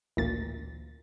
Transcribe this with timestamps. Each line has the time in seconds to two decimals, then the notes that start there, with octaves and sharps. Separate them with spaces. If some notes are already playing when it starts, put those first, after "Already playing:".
0.17 A1 D2 A#2 A6